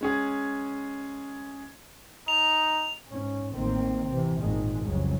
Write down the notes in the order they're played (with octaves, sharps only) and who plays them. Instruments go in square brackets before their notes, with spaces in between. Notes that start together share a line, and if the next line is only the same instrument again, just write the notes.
[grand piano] G#3 C#4 G#4
[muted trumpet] D#4 [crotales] F7
[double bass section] G#2 C#4
A1 D#3 A#3 C4
C3 E3
G#1 E2 A#2 D#3 G#3
F1 C2 C#3 F#3 G#3